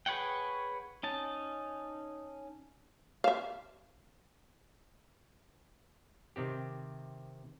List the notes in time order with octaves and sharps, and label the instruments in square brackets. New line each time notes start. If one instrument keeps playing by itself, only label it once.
[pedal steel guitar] G#4 B4 C#5 F#5 G5
C#4 D#4 A5
[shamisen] E5 F5
[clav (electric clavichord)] C3 D#3 C4 G4